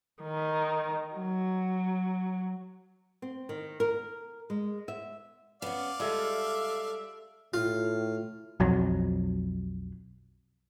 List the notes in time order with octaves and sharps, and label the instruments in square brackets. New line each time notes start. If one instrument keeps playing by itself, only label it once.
[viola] D#3
F#3
[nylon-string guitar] C4
D#3
A#4
G#3
E5
[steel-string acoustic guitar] B3 C#4 [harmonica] D5 F5
[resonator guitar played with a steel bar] G3 G#3 F4 [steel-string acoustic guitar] A4 [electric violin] E5
[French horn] A2 [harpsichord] F4
[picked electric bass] B1 F2 F#3